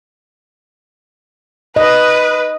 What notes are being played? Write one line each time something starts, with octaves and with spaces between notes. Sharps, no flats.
B4 D#5